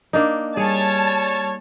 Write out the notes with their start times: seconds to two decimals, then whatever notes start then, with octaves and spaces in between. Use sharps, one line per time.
0.13 A#3 D4 D#4
0.57 G3 G#4 C#5 A5